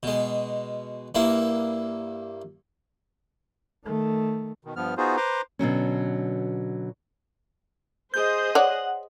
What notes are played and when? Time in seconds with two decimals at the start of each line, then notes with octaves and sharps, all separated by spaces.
0.03 B2 G#3
1.15 G2 A#3 E4
3.84 D#3 A3
4.65 B2 D#3
4.76 G2 F3 B3 F6
4.97 B3 D#4 F4 F#4 G#4 C5
5.17 B4 C5 A#5 C6 D6
5.59 B2 D3 F#3 C#4
8.14 G#4 C5 D#5 G6
8.55 C#5 D5 F#5